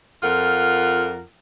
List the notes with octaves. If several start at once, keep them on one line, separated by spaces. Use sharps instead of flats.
F2 F4 A#4 F#5